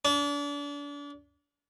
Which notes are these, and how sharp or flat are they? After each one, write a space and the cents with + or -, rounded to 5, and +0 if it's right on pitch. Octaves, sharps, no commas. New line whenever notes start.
D4 -35